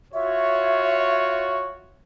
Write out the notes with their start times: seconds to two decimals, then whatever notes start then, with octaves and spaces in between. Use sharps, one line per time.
0.14 F4 F#4 C#5 E5